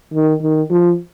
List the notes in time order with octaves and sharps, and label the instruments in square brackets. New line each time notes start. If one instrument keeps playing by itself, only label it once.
[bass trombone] D#3
D#3
F3